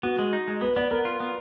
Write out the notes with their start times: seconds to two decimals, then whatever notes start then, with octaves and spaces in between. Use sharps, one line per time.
0.03 B3 F#4
0.19 G#3
0.33 D#4
0.48 G#3
0.61 B3 B4
0.76 B3 D5
0.91 B3 A#4
1.05 F4
1.20 B3